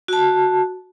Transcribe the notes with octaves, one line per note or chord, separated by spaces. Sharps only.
F#4 A5